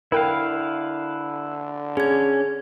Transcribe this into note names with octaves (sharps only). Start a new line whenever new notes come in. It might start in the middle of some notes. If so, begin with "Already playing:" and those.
D3 E4 A#4 B4 F5 G5
C#4 G#4 G#6